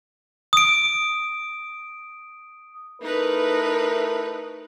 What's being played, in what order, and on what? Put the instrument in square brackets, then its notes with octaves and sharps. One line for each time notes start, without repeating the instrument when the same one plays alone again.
[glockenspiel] D#6 D7
[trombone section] A3 E4 A#4 [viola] D#4 B4